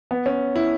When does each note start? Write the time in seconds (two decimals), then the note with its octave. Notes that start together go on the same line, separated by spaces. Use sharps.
0.11 B3
0.26 C#4
0.56 E4